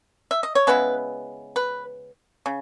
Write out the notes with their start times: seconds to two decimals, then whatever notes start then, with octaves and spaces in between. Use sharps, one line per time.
0.31 E5
0.43 D#5
0.55 C#5
0.67 C#3 G#3 B3 E4 B4
1.56 B4
2.46 C#3